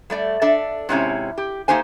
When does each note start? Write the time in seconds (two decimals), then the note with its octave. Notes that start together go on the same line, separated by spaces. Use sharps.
0.10 G3 A3 D5
0.42 D4 A4 D5 E5
0.89 G#2 C3 C#4 E4
1.38 G4
1.68 A3 A#3 D#4 G4 C5 G#5